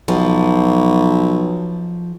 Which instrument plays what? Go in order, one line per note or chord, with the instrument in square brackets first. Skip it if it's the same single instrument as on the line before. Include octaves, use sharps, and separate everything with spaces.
[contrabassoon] B1 [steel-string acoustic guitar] F3